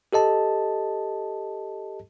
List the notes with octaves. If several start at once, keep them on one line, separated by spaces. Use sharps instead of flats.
G4 A4 D#5 A5